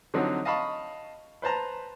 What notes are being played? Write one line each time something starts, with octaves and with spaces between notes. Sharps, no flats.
D3 F3 F#3 C4 D#4
D#5 F5 A5 B5 C#6
B4 C5 A5 A#5